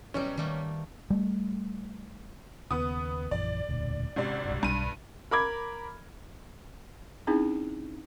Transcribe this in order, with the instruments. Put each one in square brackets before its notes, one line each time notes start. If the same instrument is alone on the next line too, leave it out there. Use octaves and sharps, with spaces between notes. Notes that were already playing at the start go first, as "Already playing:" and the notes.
[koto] B2 F#3 G3 [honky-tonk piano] C#4
[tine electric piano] D#3 [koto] G3 A3 A#3
[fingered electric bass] G3 A3
[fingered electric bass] D#2 C#3 [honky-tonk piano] B3 D#6
[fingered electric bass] A#1 F#2 E3 [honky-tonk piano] D5
[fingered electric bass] E1 D2 A#2
[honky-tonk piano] G#1 C3 D5 [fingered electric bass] C#4
[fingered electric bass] B1 G2
[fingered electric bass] B1 [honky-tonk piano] G2 D#7
[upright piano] A#4 B5 D6 G#6
[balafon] C4 C#4 D#4 E4 G#4